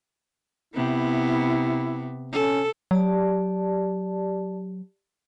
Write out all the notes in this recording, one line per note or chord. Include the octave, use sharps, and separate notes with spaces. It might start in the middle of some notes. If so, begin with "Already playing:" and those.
C3 B3 E4
C#4 A4
F#3 G4 D5 A5